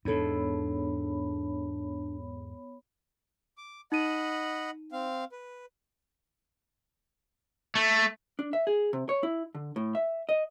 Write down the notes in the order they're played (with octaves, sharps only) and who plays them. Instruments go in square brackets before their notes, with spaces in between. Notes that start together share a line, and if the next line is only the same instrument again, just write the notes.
[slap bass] E2 G#2 [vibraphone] B3 C#5 B5 [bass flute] D4 [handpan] D#4 A4
[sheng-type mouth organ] D6
[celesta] D#4 D#7 [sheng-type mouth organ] D#5 F#5 B5
[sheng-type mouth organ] C4 F5
B4
[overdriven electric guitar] A3
[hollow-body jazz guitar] D4
E5
G#4
C3
C#5
E4
D3
A2
E5
D#5